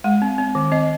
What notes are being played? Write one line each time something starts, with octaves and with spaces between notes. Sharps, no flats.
G#3 F#5
C4
C4
D#3
C4 D#5